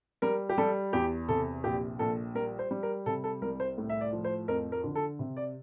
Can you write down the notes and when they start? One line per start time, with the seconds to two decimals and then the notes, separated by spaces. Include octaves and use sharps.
0.22 G3 A#4
0.49 G4
0.58 G3 A4
0.93 E2 G4
1.29 C3 A4
1.64 A#1 G4
1.99 A#1 A4
2.35 G3 A#4
2.59 C5
2.71 G3
2.83 A#4
3.06 C3 A4
3.24 A4
3.42 C2 A#4
3.60 C5
3.78 A2
3.90 E5
4.01 D5
4.13 F3
4.24 C5
4.48 F2 A#4
4.72 A#4
4.84 D3
4.95 A4
5.19 C3
5.37 D5